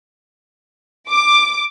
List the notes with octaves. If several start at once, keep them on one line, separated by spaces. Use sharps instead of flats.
D6